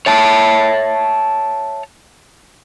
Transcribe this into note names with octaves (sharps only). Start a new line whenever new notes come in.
C#5 E5 A5